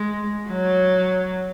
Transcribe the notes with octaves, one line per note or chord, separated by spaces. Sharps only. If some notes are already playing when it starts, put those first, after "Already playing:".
Already playing: G#3
F#3